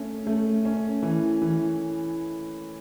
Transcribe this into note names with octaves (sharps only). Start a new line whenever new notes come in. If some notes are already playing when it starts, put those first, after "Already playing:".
Already playing: A3 C#4
A3
C#4
E3
E3